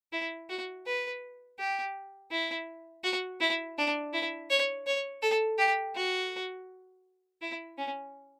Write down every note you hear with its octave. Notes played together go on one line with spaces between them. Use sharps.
E4
F#4
B4
G4
E4
F#4
E4
D4
E4
C#5
C#5
A4
G4
F#4
E4
C#4